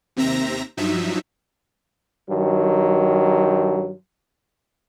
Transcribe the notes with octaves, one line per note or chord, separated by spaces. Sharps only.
D#2 C3 C4 E5 A#5 A#6
G2 F3 F#3 D#4 E5
G2 D#3 F#3